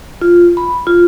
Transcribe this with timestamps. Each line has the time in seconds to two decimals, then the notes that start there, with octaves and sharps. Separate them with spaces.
0.21 F4
0.57 B5
0.87 F4